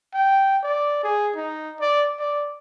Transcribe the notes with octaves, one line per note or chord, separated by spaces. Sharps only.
G5
D5
G#4
D#4
D5
D5